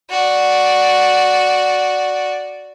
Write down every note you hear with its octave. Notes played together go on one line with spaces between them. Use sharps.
F#4 D5